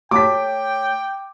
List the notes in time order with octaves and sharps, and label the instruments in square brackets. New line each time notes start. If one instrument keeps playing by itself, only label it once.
[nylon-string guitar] A3 C#5 A5 [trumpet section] G5 [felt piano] D6 B6